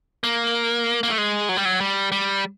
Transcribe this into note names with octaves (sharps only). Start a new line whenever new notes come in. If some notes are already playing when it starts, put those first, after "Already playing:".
A#3
A#3
A3
G#3
F#3
G3
F#3
G3
G3